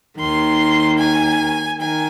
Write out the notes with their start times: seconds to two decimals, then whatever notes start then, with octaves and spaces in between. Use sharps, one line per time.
0.19 D#2 D#3 C6
0.99 G#5
1.78 D#3 G#5